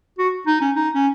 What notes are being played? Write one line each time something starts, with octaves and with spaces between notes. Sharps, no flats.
F#4
D#4
C#4
D#4
C#4